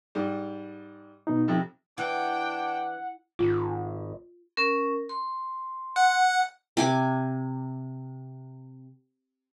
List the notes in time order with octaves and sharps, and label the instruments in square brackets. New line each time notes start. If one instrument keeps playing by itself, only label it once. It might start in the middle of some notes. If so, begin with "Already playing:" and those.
[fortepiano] G#2 G3
[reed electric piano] B2 D#4
[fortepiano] F2 C3
[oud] E3 [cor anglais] D4 [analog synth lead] F#5 [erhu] G5
[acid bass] G#1 [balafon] F4
[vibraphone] C#4 A#4
C6
[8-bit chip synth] F#5
[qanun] C3 G#5 D6